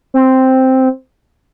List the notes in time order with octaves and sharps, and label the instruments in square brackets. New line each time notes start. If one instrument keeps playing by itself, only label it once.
[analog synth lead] C4